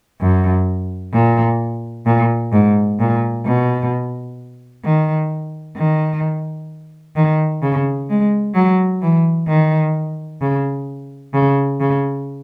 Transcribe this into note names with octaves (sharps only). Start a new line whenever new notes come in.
F#2
A#2
A#2
G#2
A#2
B2
D#3
D#3
D#3
C#3
G#3
F#3
E3
D#3
C#3
C#3
C#3